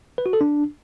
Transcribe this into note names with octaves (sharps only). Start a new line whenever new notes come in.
B4
F#4
A4
D4